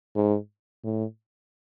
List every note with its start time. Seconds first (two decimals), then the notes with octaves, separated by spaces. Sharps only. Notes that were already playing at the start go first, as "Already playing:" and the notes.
0.16 G#2
0.84 A2